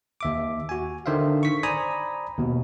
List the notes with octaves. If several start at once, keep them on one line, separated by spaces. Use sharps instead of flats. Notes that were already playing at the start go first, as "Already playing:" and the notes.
D#2 E5 D6
F#4 G#5
D3 D#3 C5 E5 F5
C#6 B6
C5 D5 G#5 A#5 B5 D#6
D#2 B2